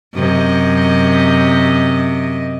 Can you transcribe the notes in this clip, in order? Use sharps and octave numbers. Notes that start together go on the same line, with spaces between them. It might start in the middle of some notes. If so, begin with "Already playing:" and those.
F#2 C3 D#5